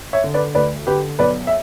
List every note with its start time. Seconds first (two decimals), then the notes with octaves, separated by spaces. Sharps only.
0.13 C#5 E5
0.24 D3
0.34 B4 D5
0.55 D2 B4 D5
0.87 D3 G4 B4
1.19 B1 B4 D5
1.47 E5